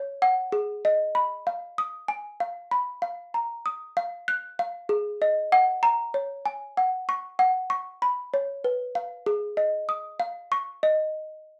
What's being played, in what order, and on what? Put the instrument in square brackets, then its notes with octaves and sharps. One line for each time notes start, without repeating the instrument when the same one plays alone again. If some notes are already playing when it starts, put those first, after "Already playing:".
Already playing: [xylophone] C#5
F#5
G#4
D#5
B5
F5
D#6
G#5
F5
B5
F5
A#5
D#6
F5
F#6
F5
G#4
D#5
F#5
A#5
C#5
G#5
F#5
C#6
F#5
C#6
B5
C#5
B4
F5
G#4
D#5
D#6
F5
C#6
D#5